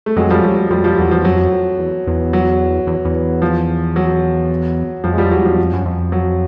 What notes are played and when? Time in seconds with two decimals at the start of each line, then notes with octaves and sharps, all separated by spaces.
0.06 A3
0.16 F2 F#3 G#3
0.31 F3 G3
0.44 F#3
0.57 F#3
0.70 F2 F3 G3
0.84 F3 G3
0.98 E2 F#3
1.11 F3
1.25 F2 F#3
1.52 F2
1.78 E2
2.07 E2
2.33 F#3
2.87 E2
3.05 E2
3.42 F3
3.96 F#3
5.04 F2 F3
5.13 G#3
5.18 F3 G3
5.31 E2 F#3
5.45 F3
5.58 F2
5.74 F#2
5.86 F2
6.12 F#3